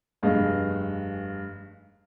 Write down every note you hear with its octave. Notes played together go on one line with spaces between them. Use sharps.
F1 G2 G#4 D#5 F5